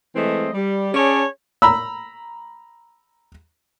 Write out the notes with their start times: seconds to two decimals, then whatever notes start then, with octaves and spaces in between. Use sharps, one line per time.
0.16 E3 G#3 A3 C4 D#5
0.53 G3
0.94 C#4 G#4 C#5 D5 A5
1.62 A#5 B5 E6